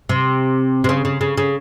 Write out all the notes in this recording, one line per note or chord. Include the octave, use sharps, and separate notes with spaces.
C3
C3
C#3
C#3
C#3
C#3